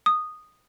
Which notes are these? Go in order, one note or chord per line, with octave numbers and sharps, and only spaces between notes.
D#6